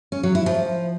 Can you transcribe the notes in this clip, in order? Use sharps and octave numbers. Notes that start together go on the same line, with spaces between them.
C#4
F#3
E4
F3